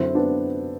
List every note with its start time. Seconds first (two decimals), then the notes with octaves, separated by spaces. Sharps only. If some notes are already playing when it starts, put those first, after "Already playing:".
Already playing: F#2 D3 C4 E4
0.15 B3 D4